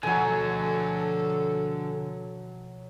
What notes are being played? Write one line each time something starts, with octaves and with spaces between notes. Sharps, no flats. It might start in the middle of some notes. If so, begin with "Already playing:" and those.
B2 D3 F3 F#3 A3 A4 G#5